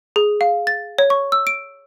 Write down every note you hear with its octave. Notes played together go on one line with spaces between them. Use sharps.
G#4
F5
A6
C#5
C#6
E6
D7